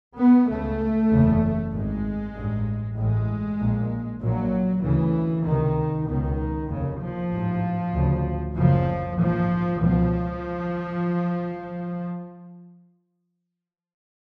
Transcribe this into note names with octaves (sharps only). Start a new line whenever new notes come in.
B3
C#2 C#3 A3
F#1 E2 C#3
G#1 G#2 G#3
A1 G2
A1 A2 G#3
A#1 A#2
A#1 A#2 F#3
D2 C#3 E3
C#2 C3 D#3
C#2 B2 D#3
F1 D#2 C#3
F3
A1 G#2
D2 C#3
F#1 F#2 C#3 F3
A#1 G#2 F3
C#2 B2 F3